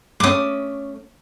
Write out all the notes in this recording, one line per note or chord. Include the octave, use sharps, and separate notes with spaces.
A3 C#4 D6 D#6